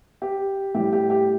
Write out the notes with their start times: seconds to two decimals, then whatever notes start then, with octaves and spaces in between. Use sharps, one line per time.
0.22 G4
0.75 A2 G3 G4
0.93 G4
1.10 G4